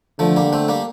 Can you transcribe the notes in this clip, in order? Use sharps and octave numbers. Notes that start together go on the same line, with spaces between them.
D3 F3 A3
G3 A#3
A3 C4
G3 A#3